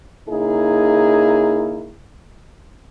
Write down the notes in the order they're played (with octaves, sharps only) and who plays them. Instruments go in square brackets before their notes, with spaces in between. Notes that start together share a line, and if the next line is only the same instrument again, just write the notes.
[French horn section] C#3 A#3 D#4 E4 G#4